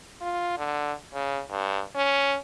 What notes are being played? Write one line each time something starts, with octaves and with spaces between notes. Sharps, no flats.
F4
D3
C#3
G2
C#4